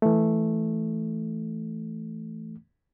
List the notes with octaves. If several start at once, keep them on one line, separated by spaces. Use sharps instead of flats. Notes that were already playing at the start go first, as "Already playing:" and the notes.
E3 A3